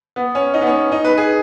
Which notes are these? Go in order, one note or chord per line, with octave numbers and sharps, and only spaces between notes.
B3
C#4
D#4
B3
C#4
D#4
B4
G#4